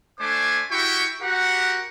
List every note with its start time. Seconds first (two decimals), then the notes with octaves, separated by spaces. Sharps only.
0.20 A3 D4 C5 D5 G#5 D6
0.71 E4 F#4 G4 G5 C#6
1.22 F#4 G4 A#4 F#5